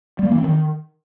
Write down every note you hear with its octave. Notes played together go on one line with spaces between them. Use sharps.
G3
A#3
E3
C4
D#3